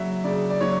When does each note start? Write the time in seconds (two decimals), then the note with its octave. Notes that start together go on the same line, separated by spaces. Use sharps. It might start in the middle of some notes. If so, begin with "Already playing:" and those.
Already playing: C#3 F#3 E5
0.24 C#3 D5
0.50 D5
0.61 F#3 C#5